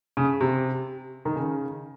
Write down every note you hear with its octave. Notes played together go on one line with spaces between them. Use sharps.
C#3
C3
D#3
C#3